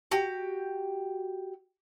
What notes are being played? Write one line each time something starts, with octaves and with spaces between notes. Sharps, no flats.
F#4 G4 G5